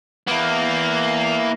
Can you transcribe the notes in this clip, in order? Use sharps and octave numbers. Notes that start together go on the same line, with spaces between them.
A#3 B3 E4